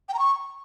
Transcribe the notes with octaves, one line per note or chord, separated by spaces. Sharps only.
G5
A#5
C#6